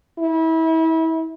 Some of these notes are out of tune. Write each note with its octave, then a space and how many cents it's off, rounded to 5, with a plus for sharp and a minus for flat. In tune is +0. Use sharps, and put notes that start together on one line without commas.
E4 -30